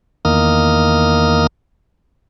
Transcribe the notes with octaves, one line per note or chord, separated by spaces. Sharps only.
E2 D#3 A#3 D#6 F6